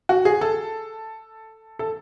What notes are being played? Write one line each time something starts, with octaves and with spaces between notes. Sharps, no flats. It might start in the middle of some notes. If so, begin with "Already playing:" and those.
F#4
G#4
A4
A4